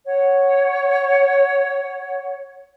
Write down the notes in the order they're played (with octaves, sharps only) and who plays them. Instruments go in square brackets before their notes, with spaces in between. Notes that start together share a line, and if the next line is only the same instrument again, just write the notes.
[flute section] C#5 F#5